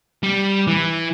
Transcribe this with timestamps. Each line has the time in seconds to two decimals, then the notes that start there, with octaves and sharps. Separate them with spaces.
0.23 G3
0.67 E3